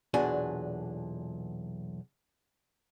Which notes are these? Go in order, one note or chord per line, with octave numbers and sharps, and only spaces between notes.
B1 E2 A#2 D4 F#4 G#5